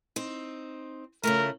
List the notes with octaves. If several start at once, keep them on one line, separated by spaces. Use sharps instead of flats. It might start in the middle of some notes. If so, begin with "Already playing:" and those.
C4 D#4
C#3 F3 A3 A#4